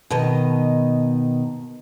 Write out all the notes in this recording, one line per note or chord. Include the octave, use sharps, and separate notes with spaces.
B2 D#3 D#5